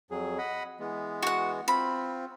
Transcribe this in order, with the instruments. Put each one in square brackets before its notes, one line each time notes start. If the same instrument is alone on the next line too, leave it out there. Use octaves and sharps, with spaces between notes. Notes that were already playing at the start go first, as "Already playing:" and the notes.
[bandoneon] F2 F#3 G#4
D#5 F#5 B5
E3 G#3 B3
[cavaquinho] F#4 F#5
[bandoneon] C4 F4 [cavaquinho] B5